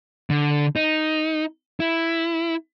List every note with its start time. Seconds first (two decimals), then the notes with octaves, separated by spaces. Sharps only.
0.30 D3
0.76 D#4
1.80 E4